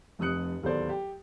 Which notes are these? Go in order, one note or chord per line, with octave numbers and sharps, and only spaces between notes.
F1 F2 D#6 F#6 C#7
D1 D#2 B3 A4 C5 D5
G4